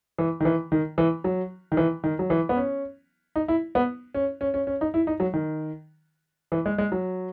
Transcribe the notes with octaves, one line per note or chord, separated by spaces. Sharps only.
E3
D#3
E3
D#3
E3
F#3
D#3
E3
D#3
F#3
E3
B3
C#4
D#4
E4
B3
C#4
C#4
C#4
C#4
D#4
E4
D#4
F#3
D#3
E3
G#3
G#3
F#3